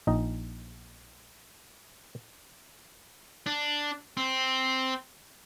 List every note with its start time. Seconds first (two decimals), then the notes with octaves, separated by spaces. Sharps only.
0.07 A#1 D#4 D#5
3.46 D4
4.17 C4